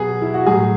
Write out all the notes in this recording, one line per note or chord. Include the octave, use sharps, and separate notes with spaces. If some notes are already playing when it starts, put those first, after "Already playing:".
Already playing: B2 F#3 G#4 B4
E4
F#4
A2 F#3 G#4